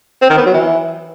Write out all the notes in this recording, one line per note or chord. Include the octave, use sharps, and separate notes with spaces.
C4
D#3
B3
F#3
E3